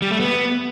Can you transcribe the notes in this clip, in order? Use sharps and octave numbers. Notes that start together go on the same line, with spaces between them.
G3
A3
B3